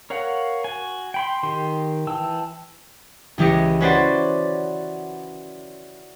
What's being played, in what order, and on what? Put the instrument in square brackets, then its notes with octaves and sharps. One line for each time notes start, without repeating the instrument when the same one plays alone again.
[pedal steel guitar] A#4 C#5 F5 F#5
F#4 G#5
G5 B5 C6
D#3 G4 C6
E3 G5 A5 E6
[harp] C#2 E3 G4 D#5 C#7
C#4 F#4 B4 C5 D5 F#5